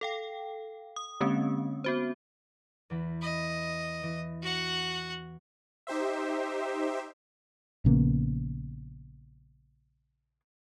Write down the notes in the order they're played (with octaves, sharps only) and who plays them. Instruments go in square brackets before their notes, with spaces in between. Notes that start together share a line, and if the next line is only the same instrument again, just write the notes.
[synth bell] A4 F5 G5
D#6
D3 G#3 A#3 C4 C#4
B3 F#4 C5
[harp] E2 E3 B5
[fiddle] D#5 [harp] B5 B6
[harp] E3
[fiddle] F#4 F#5
[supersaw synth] D#4 G4 C5 E5
[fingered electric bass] A#1 C#3 A#3 B3